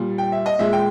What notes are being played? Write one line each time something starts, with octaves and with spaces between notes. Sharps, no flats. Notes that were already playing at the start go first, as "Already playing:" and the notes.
Already playing: A#2 G3
G5
E5
D#5
A#2 G#3 E5
G5